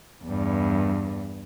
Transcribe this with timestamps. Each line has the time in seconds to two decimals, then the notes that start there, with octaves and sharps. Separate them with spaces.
0.24 E2 G2